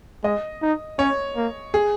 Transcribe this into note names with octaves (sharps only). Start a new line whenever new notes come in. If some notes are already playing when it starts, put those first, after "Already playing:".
G#3 D#5
D#4
C#4 C#5
A#3
G#4